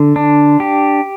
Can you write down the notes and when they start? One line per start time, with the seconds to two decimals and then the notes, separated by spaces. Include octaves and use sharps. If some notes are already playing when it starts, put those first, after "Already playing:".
Already playing: D3
0.16 D4
0.60 G4